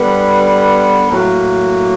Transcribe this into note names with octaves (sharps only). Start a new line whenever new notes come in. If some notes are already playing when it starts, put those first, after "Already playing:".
Already playing: D3 G3 B3 B4
A2 F#3 A#3 A#4